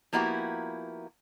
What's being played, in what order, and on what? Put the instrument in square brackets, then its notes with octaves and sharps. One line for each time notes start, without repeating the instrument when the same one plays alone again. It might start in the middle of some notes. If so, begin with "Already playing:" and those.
[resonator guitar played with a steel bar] F3 A#3 B3 E4 F#4 G4